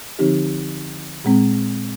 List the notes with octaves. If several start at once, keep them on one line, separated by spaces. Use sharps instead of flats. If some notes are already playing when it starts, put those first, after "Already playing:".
D3 F3 C4 D#4 G4
A#2 G#3 C4